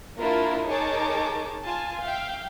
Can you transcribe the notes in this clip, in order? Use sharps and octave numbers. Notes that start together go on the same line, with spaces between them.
A#3 D4 E4 F4 A#4
D#4 G#4 A#4 C#5 A5 D6
F4 G#5 A5
E5 F5 G5